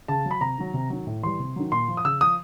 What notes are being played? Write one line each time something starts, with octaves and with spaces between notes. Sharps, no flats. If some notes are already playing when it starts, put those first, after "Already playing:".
C#3 A5
F#3
B5
C3 A#5
D#3 F#3
C3
D#3 F#3
A2
E3 G3 C6
C3
D#3 F#3
A#2 C6
F3
D#6
C#3 E6
F3 D#6